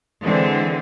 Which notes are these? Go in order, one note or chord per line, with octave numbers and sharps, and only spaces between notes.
D3 E3 G#3 C4